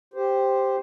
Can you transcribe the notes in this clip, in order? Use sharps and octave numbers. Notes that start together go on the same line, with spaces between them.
G4 C5